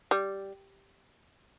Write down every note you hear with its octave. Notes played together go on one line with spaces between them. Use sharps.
G3